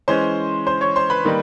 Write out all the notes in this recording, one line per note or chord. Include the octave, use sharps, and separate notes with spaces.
E3 G#3 C#4 C5 C6
C5 C6
C#5 C#6
C5 C6
B4 B5
D#3 G3 A#3 D#4